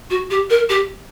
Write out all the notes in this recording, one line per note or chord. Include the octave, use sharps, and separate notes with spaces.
F#4
G4
A#4
G4